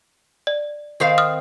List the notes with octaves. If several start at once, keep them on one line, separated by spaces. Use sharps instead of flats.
D5
D#3 C4 F5
D#6 F6